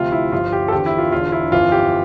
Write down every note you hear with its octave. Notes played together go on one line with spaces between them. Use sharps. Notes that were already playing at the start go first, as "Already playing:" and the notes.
Already playing: D2 C3 F3 F4
E4
G1 G2 F3 F4
G4
A4
E2 D3 F3 G4
E4
F4
E1 E2 D3 F4
E4
G1 F2 E3 F4
G4